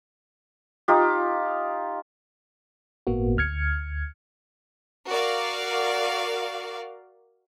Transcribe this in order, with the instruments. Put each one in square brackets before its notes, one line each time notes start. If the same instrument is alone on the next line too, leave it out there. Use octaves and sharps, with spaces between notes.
[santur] D#4 F4 G4
[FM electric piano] G1 A2 A#3 B3 F#4
D2 F6 G#6 C#7
[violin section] F#4 A#4 D5 F5